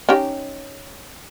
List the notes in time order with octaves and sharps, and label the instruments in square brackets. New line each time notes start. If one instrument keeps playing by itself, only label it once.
[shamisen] C#4 D#4 G4